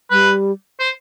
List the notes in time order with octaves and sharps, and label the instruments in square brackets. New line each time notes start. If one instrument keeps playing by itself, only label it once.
[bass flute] G3 [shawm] B4
[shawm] C5